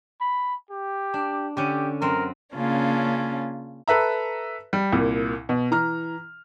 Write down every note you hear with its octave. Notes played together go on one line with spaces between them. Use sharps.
B5
G4
D4
D3 C#4 G4
F#2 C4 A#4
C#3 A#3 C#4 D4 F4
A4 B4 E5 A#5
G3
C2 A#2
B2
E3 A#5 F6